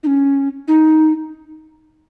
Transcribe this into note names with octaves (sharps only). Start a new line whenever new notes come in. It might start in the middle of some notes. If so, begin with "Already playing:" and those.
D#4
C#4
D#4